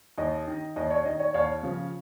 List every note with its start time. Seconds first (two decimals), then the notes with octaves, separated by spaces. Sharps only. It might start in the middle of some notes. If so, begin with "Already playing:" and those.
0.18 D#2 D#5
0.47 D#3
0.76 D#2 D#5
0.90 C#5
1.05 D#3 D#5
1.20 C#5
1.34 D#2 C#5 F5
1.63 C#3 F3